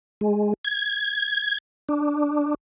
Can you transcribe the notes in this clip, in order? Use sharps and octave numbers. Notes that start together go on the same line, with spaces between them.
G#3
G#6
D4